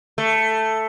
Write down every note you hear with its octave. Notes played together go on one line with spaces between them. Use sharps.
A3